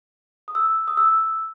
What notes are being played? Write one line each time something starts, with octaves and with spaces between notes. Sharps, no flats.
D#6
E6
D#6
E6